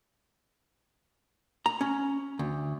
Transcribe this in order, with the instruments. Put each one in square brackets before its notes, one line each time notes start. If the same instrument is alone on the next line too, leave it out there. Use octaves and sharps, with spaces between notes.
[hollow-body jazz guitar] A#5
C#4
D2